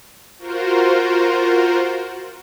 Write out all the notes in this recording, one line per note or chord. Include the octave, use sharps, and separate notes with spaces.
F4 F#4 A#4 C5